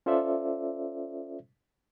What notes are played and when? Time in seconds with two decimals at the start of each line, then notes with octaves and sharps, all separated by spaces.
0.06 C#4 F4 A4 C5 D5 E5